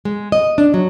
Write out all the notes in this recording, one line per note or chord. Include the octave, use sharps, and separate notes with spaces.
G#3
D#5
D4
F#3